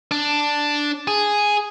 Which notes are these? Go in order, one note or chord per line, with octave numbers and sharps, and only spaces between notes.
D4
G#4